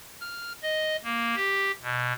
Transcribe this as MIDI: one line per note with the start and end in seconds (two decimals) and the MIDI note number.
0.21 0.53 89
0.63 0.96 75
1.03 1.35 58
1.35 1.72 67
1.82 2.13 47